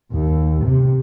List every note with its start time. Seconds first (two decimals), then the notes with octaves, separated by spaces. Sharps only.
0.13 D#2
0.65 C3